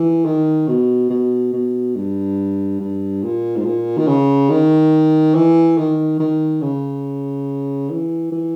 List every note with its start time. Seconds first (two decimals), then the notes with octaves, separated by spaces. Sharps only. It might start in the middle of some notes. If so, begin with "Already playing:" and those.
Already playing: E3
0.25 D#3
0.68 B2
1.10 B2
1.53 B2
1.95 G2
2.80 G2
3.23 A#2
3.56 G#2
3.65 A#2
3.97 D#3
4.07 C#3
4.50 D#3
5.35 E3
5.78 D#3
6.19 D#3
6.62 C#3
7.90 E3
8.32 E3